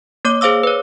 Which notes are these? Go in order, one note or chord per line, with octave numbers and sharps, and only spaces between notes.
A#3 C#5 D6
G#4 C5 F5 D6 E6
B4 C#5